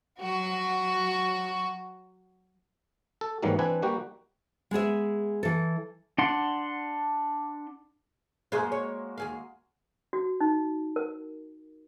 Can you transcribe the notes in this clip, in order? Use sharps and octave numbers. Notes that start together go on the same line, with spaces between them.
F#3 F#4
A4
G#2 D#3 E3 F#3 G3 A#3
E3 C4 D4 B4 G#5
G3 A#3 F#4 G4
G#3 B3 G#4 E5
E3 A4
D4 F#5 C6
F#2 G#3 A#3 F#4 G#4 C5
C#5
D#2 G#4 F5
F#4
D#4
A#4